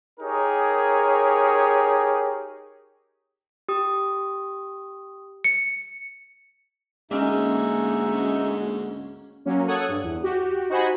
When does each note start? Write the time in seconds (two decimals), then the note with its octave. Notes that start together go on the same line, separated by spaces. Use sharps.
0.20 D#4 G4 G#4 A#4 C#5
3.69 G4 D#6
5.44 C#7
7.11 D2 G#2 G#3 A#3 C#4 D#4 F#4 E5
9.45 F#3 A#3 C#4
9.67 A4 C#5 F#5 D#6 F#6 G#6
9.88 G2
10.03 E2
10.23 F#4 G4
10.70 D#4 F#4 C5 F#5 G#5 B5